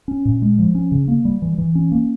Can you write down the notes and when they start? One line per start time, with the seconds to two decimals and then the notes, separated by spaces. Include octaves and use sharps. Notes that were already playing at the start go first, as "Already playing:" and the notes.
0.08 C#4
0.25 A#2
0.42 G#3
0.59 F3
0.75 C#4
0.92 C#3
1.08 A#3
1.25 G3
1.42 E3
1.58 E3
1.75 C#4
1.92 A#3